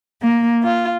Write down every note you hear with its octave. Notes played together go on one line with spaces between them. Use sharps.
A#3
F4